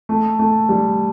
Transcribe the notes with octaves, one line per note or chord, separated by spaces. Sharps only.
A3
A3
G3